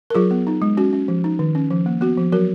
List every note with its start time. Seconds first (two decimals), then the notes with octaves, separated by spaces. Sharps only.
0.10 A#4
0.15 F#3 F4 G#4
0.31 B3
0.47 D#4
0.62 G#3
0.77 C#4 F#4
0.93 C#4
1.08 F3
1.24 D#4
1.39 D#3
1.55 C#4
1.71 F3
1.86 A#3
2.01 B3 F#4
2.18 F3
2.32 F#3 F#4 A#4